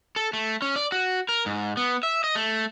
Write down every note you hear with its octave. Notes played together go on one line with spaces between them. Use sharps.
A4
A3
C#4
D5
F#4
A#4
G#2
B3
E5
D#5
A3